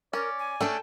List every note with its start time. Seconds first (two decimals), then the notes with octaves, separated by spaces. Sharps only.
0.13 C#4 A#4 D5
0.39 G#5
0.61 A3 C#4 D4 A4 G5 A5